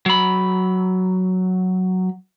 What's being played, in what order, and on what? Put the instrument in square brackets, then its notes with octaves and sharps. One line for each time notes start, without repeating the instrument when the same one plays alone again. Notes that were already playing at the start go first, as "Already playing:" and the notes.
[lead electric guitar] F#3 B5